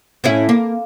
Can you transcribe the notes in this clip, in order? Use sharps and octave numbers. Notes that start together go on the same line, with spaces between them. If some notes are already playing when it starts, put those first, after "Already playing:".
A2 C#4 E4
A#3